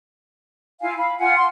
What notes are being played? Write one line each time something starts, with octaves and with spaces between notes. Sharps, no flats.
E4 F4 F5 G#5
F5 B5
F4 F5 F#5 G#5
C6